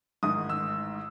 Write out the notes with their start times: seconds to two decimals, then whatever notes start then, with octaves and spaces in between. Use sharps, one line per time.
0.23 A1 G#2 D#3 D#6
0.49 E6